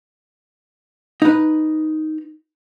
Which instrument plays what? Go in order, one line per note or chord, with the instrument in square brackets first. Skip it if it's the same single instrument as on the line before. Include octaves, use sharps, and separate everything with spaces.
[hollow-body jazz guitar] D#4 B4